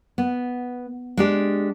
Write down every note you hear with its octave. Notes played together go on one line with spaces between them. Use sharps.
B3
G#3 D4 G4